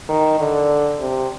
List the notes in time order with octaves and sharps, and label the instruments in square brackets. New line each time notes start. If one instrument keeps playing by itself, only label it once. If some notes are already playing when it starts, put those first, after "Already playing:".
[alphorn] D#3
D3
C3